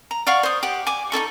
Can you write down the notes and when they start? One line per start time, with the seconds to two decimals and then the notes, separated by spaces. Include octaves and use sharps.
0.11 A#5
0.27 D5 F5 F#5 C#6
0.43 C5 D#6
0.63 G4 F#5
0.87 G#5 D6
1.12 D#4 E4 A4 C#6